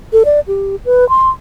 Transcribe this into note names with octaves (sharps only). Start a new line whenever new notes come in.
A4
D5
G4
B4
C6